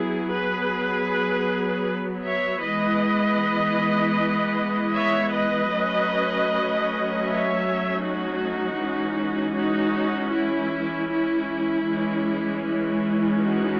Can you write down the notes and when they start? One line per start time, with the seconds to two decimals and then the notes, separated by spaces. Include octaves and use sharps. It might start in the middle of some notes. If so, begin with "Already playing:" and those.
Already playing: F#3 B3 E4 G#4
0.32 G#4 B4
2.24 C#5 E5
2.62 E3 G#3 B3 B4 D#5
4.93 C#5 E5
5.32 B4 D#5
5.70 F#3 A3 C#4
7.25 C#5 E5
8.02 D#4 F#4
8.78 E3 G#3 C#4
9.55 D#4 F#4
10.32 E4
11.10 E4
11.87 E3 G#3 C#4
12.64 E4
13.40 D#4 F#4